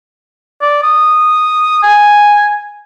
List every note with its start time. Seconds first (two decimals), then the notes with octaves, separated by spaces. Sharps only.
0.61 D5
0.83 D#6
1.83 G#5